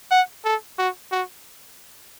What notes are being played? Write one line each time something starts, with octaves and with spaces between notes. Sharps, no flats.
F#5
A4
F#4
F#4